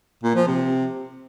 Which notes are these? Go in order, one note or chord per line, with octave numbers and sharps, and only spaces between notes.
A#2
F3
C3